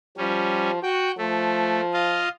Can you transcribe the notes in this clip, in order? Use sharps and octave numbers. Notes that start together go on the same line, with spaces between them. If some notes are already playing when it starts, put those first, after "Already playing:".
F3 G3 C#4
F#4 G5
F3 A3
F4 D#5 F5